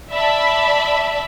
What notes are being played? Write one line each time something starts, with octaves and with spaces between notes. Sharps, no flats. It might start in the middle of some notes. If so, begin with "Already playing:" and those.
D5 E5 A5 B5